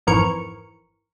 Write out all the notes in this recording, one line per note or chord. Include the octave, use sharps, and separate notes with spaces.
G#1 F2 E3 A#4 C#6